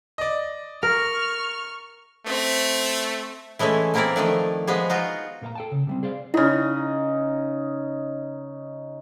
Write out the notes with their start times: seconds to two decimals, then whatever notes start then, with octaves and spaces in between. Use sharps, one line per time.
0.18 D5 D#5
0.83 A#4 C#6 F6
2.26 A3 C4 E5
3.59 E3 G#3 A3 C#4 E4
3.94 E3 A#3 C4 E4 A#4 D5
4.16 D#3 F3 A3 D4
4.67 F3 G#3 B3 G#4
4.90 D#4 F4 F#4
5.42 A#2 A#3 A#4 F5 A#5
5.56 A4 G5 A5
5.72 C#3
5.87 C3 G3 C4
6.03 G#4 C5 D5 F5
6.34 C#3 D#4 E4